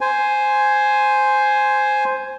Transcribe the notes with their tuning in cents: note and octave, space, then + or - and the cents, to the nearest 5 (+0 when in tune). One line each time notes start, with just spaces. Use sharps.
C5 +0 G#5 +5